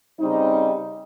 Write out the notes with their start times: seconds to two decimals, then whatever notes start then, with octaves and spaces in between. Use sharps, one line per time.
0.19 C#3 G3 C4 D#4